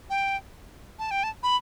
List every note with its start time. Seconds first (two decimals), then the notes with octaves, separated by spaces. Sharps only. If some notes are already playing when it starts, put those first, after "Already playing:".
0.10 G5
0.99 A5
1.11 G5
1.23 A5
1.43 B5